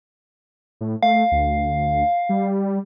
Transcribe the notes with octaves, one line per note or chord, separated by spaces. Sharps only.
A2
A3 F5
D2
G3